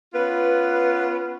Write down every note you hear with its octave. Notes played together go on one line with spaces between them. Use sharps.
B3 C#4 F4 B4